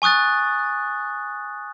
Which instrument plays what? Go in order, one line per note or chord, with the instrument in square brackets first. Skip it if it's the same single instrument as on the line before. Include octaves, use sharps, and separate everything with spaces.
[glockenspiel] G#5 C#6 D#6 F#6 A6